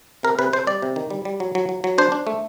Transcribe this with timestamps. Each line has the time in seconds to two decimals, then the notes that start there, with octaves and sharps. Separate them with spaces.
0.23 C3 A#4
0.39 C3 B4
0.53 C3 C5
0.67 G3 D5
0.82 C3
0.96 D#3
1.10 G3
1.25 G3
1.40 F#3
1.55 F#3
1.69 F#3
1.84 F#3
1.98 D4 C5
2.12 D4
2.27 A3